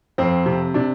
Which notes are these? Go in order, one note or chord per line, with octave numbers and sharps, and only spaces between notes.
F2 C4
C3
C3 D4